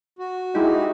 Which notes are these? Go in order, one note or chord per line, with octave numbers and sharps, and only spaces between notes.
F#4
G#3 D#4 E4 G4